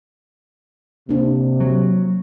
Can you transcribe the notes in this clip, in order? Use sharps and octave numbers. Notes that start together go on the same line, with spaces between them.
C3 A#3 D4
F#3